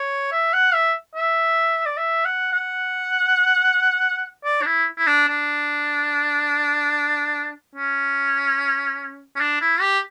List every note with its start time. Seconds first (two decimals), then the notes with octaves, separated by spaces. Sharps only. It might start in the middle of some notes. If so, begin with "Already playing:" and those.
Already playing: C#5
0.32 E5
0.53 F#5
0.74 E5
1.15 E5
1.86 D5
1.97 E5
2.25 F#5
2.52 F#5
4.44 D5
4.62 D4
4.66 E4
4.98 E4
5.07 D4
5.28 D4
7.75 C#4
9.36 C#4
9.40 D4
9.61 E4
9.81 G4